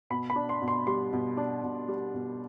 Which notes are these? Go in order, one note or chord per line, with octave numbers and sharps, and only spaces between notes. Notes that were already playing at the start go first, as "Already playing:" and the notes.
B2 B5
B5
D4
C6
B2
C6
G3 C6
B2
D4
B2
G3
B2